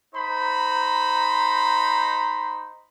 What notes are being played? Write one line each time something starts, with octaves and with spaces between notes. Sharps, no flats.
D#4 C5 A#5 B5